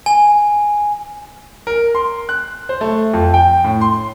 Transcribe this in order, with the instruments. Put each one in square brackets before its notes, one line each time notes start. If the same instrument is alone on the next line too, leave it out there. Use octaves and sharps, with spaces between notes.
[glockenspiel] G#5
[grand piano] A#4
C6
F#6
C5
A3
F2
G5
A2
C6